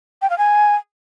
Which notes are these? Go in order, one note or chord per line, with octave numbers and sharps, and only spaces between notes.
G5
F5
G#5